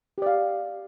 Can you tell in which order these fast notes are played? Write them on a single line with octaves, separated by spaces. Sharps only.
G4 D5 F5